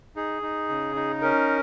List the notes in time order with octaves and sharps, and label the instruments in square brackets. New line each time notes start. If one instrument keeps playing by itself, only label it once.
[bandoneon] D#4 G#4
D#4
C#3
D#4
C#4 A#4